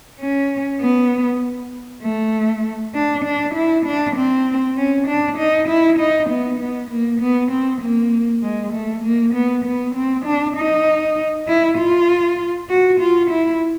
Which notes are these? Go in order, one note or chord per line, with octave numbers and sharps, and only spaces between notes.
C#4
B3
A3
D4
D4
E4
D4
C4
C#4
D4
D#4
E4
D#4
B3
B3
A#3
B3
C4
A#3
G#3
A3
A#3
B3
B3
C4
D4
D#4
E4
F4
F#4
F4
E4